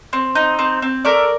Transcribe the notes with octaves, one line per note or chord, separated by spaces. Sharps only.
C4
D#4
C4
C4
A3 A#4 D5